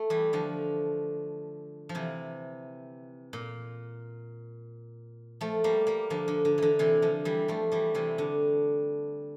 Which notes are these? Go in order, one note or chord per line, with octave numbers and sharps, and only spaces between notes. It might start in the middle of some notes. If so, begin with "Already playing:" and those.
Already playing: A3
E3 G3
D3 F3
F3
C3 E3
A#2
F3 A3
G3 A#3
G3 A#3
D3 F3
D3
D3
D3 E3
C3 E3
D3 F3
E3 G3
F3 A3
E3 G3
C3 E3
D3